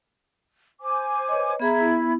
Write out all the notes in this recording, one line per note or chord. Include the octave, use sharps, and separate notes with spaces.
C5 G#5 D6
B4 C#5 D#5
B3 G#4 E5 A#5 B5 G#6
B3 E4